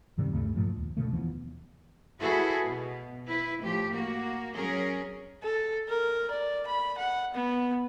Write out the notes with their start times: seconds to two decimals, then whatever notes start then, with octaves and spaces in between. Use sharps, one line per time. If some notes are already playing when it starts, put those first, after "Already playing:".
0.18 F#2 C3 D#3 G3
0.32 D2 G2 C#3 A3
0.55 G2 A#2 F3 A3
0.78 D#2
0.97 B2 D3 A3
1.13 D#2 E3 F3 B3
2.21 E4 F#4 G#4 A4 B4
2.65 B2
3.26 E4 B4
3.62 A2 F3 G4
3.91 A#3 F#4
4.55 F#3 C#4 G#4 A#4
5.43 A4
5.89 A#4
6.31 D5
6.67 B5
6.98 F#5
7.34 B3